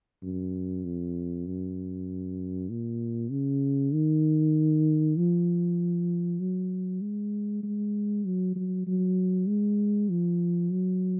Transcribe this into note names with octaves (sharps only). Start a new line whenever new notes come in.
F#2
F2
F#2
A#2
C#3
D#3
F3
F#3
G#3
G#3
F#3
F#3
F#3
G#3
F3
F#3